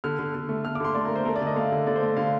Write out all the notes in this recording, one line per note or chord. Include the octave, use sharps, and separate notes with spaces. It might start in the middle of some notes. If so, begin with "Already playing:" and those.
D3 F6
D3
D3
A3
A3 F6
D6
D3 C6
A3 D5
A#4
A3 C5
A3 A#4
D5
D3
D#5
A3 F5
D3
D3 D5
C5
A3 D5
D3 F5